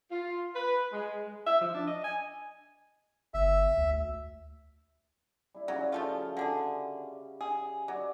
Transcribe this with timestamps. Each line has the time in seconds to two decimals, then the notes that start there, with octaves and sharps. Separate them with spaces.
0.11 F4
0.56 B4
0.93 G#3
1.46 E5
1.61 F3
1.74 D4
1.87 D#5
2.04 G#5
3.34 G1 E5
3.77 D2
5.54 G3 E4
5.68 C#3 F#3 G3 F#4
5.92 F3 A3 F4
6.37 D3 D4 G#4
7.41 G#4
7.88 F#3 D5 D#5